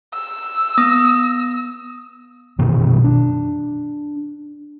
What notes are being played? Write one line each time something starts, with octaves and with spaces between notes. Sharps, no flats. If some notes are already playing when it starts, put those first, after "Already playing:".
E6
B3 D#6 A#6
F#2 B2 D#3 E3
D4